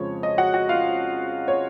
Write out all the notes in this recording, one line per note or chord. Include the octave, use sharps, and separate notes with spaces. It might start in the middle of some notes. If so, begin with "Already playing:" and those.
Already playing: F2 C#3 F3 G#3 C4 C#5
D#5
F#4 F#5
F#4 F#5
F4 F5
C#5